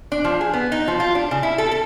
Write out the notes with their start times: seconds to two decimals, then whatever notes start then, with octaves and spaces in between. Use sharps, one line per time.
0.12 D4
0.24 F3
0.41 G#4
0.53 B3
0.72 D#4
0.88 F3
1.00 F4
1.15 D4
1.31 C#3
1.43 E4
1.58 A4
1.71 A4